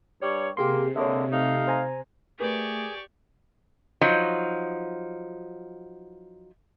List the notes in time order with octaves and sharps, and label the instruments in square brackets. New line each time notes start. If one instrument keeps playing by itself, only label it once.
[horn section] G2 G3 C#5
[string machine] C3 [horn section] A#3 [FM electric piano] G4 G#4 C6
[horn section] D3 G#3 A#3 [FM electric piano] C#5 E5
[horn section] A3 D#4 F5
[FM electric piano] C5 G#5 A#5
[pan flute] A3 [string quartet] G4 D5 C#6 [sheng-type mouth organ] G#4 [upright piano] A#4 B4
[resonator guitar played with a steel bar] F3 F#3 D#4